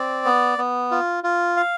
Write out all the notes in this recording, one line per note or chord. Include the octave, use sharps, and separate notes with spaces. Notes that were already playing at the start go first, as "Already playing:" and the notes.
Already playing: C4 D5
B3
B3
F4
F4
F5